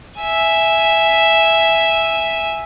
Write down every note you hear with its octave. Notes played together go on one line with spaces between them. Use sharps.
E5 G#5